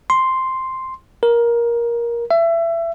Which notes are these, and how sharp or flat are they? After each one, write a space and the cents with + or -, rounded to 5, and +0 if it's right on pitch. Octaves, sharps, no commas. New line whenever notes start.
C6 +0
A#4 +15
E5 +25